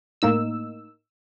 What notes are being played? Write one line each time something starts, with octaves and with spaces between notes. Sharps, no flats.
A2 A#3 D#4 E6